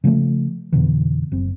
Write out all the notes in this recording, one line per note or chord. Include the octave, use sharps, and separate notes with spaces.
C#3 F3 G#3 A3
F2 B2 D3 E3
F#1 C4